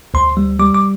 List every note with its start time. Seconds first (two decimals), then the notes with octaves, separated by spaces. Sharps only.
0.14 D2 C6
0.37 G3
0.59 G3 D6
0.75 D6